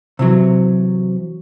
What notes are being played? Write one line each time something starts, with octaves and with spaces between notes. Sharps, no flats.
C3 E3 F#3